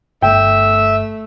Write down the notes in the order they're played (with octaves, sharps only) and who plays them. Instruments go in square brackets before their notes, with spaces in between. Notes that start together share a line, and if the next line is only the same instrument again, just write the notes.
[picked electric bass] G1 [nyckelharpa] A3 [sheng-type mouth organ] E5 [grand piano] G5